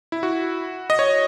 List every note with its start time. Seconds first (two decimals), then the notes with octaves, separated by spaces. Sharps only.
0.12 E4
0.23 F#4
0.90 D#5
0.99 C#5